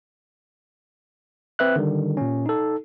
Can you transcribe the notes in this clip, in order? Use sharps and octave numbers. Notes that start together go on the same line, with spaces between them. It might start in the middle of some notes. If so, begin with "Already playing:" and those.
C4 B4 E5 F#6
D3 D#3 G3
A#2 C#4
D#4 A4